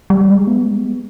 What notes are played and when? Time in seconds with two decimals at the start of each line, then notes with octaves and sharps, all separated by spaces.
0.10 G3
0.28 G#3
0.47 B3
0.67 G#3
0.85 B3